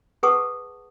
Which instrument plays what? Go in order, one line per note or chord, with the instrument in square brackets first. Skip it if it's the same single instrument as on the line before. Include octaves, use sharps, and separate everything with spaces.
[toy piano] G#4 B4 F#5 A5 C#6 D#6